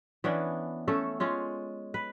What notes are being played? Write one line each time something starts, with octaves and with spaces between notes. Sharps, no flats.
E3 B3 C#4 D4
A3 C#4 A4
G#3 C#4 F4
B4